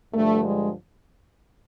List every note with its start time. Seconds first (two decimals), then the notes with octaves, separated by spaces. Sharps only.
0.14 G2 D3 F3 A3
0.43 G#3